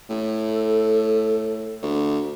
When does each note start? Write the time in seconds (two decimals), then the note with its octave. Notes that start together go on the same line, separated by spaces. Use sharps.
0.10 A2 A4
1.83 D2